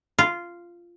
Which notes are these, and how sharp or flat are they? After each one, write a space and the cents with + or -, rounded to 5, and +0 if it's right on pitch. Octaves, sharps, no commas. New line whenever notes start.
F4 -10